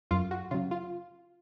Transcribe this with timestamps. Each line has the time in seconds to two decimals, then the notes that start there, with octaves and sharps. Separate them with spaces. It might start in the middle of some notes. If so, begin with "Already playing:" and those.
0.11 F#2 F4
0.31 F#4
0.51 C#3 F#3 F4
0.71 F4